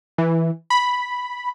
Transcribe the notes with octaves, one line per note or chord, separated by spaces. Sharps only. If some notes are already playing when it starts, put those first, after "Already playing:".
E3
B5